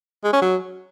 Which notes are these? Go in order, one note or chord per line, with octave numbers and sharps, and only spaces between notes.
G#3
C#4
F#3